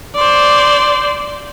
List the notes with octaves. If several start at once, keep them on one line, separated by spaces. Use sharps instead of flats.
C5 D5